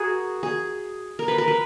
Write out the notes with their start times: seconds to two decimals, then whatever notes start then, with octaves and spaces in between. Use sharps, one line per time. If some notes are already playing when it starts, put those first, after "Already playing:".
Already playing: F#4 G#4 A#4
0.43 G#4
1.19 A#4
1.28 B4
1.38 A#4
1.48 B4